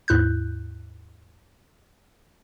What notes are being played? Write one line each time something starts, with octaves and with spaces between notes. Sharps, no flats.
D#2 G#2 E4 F#6 G6